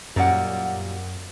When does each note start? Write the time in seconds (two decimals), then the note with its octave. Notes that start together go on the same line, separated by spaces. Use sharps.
0.16 F#2 A#2 G3 F#5